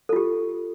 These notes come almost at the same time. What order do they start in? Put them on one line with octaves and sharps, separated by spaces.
A4 F4 G4